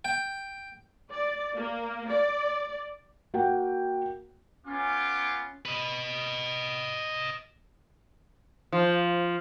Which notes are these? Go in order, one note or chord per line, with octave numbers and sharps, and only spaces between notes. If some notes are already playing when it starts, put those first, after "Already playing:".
G5
D5
A#3
D5
A#3 F#4 F#5 G5
B3 C#4 F4 D6
B4 D#5
F3